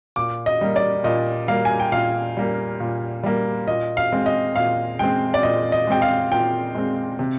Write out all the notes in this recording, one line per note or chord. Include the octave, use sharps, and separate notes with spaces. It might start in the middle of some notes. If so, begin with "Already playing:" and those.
A#2 D6
D#5
G3 A#3
D5
A#2 D#5
G3 A#3 F5
G#5
G5
A#2 F5
G3 A#3
A#2
G3 A#3
A#2 D#5
F5
G#3 C4
D#5
A#2 F5
G#3 C4 G5
D5
A#2 D#5
D#5
G#3 C4 G5
F5
A#2 G5
G#3 C4
C3